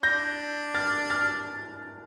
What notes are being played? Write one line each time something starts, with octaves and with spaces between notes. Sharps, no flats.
D4 G6 A#6
F6 A6
F6 A6